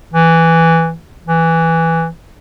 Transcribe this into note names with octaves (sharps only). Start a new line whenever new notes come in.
E3
E3